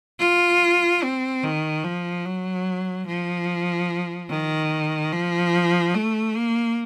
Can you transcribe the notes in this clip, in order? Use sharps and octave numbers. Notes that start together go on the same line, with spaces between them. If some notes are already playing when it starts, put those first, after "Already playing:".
F4
C4
D#3
F3
F#3
F3
D#3
F3
A3
A#3